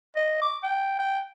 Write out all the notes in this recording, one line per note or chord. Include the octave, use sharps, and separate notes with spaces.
D#5
D6
G5
G5